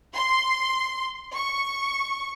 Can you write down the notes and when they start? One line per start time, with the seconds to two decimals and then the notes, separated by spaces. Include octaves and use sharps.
0.15 C6
1.33 C#6